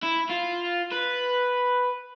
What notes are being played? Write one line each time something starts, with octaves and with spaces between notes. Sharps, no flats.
E4
F4
B4